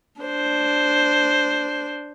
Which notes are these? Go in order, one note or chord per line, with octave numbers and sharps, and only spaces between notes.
D4 C5